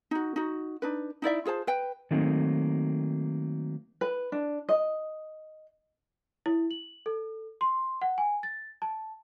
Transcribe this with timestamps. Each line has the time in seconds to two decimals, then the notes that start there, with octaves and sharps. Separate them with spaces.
0.11 D#4 F#4
0.36 D#4 F#4
0.82 D4 D#4 B4
1.22 D#4 E4 D5 E5
1.45 F4 G#4 C5 A5
1.67 B4 G5
2.11 D#3 F#3 A3 A#3 C4 D#4
4.01 B4
4.32 D4
4.69 D#5
6.46 E4
6.71 F#7
7.06 A4
7.61 C6
8.02 F#5
8.18 G#5
8.43 A6
8.82 A5